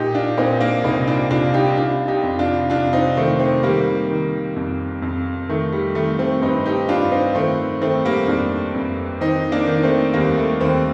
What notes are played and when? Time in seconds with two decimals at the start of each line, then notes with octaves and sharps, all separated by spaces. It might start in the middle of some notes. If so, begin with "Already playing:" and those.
Already playing: A#2 D#4 G4
0.14 D4 F4
0.37 A#2 C4 D#4
0.60 A#3 D4
0.84 C2 C4 D#4
1.07 D4 F4
1.30 C2 D4 F4
1.54 D#4 G4
1.77 C3 D4 F4
2.08 D#4 G4
2.23 F2
2.39 D4 F4
2.70 F2 D4 F4
2.93 C4 D#4
3.17 D#3 A3 C4
3.39 A3 C4
3.63 D#3 G3 A#3
4.10 D#3
4.56 F2
5.02 F2
5.49 D#3 A3
5.72 G3
5.95 D#3 A3
6.19 A3 C4
6.42 G2 C4 D#4
6.66 D#4 G4
6.89 G2 D4 F4
7.11 C4 D#4
7.35 D#3 A3 C4
7.81 D#3 A3 C4
8.05 G3 A#3
8.28 F2 A#3 D4
8.74 F2
9.21 D#3 C4 D#4
9.52 A#3 D4
9.67 D#3
9.83 A3 C4
10.13 D#2 G3 A#3
10.37 A3
10.60 D#2 A3 C4